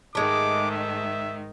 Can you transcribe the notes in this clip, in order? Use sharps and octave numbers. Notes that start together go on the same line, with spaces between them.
G#2 D#3 G#3 A3 D6
E5